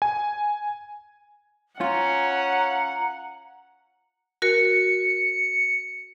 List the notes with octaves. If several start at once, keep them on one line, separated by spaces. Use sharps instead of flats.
G#5
C#4 F4 F#5 A#5
F#4 A#4 C#7